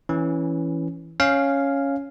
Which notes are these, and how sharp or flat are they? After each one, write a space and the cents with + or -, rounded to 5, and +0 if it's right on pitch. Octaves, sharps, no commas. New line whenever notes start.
E3 +0 C#4 +0
C#4 +0 F5 +0